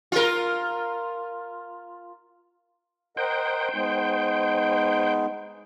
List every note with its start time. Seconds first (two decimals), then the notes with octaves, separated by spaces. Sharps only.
0.12 F4 A#4
3.17 A#4 C5 D#5 F#5 G5
3.74 G#3 B3 D#4